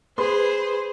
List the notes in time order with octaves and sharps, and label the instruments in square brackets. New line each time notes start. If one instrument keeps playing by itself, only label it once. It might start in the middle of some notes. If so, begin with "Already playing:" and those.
[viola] G#4 C5 [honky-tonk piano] B4 C6